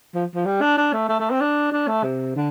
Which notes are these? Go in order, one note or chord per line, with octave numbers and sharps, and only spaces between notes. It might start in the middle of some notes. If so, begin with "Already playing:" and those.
F3
F3
G3
D4
D4
A3
A3
A3
C4
D4
D4
A3
C3
D3